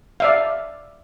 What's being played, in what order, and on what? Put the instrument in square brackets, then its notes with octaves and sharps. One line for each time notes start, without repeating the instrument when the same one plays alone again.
[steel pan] D5 E5 F5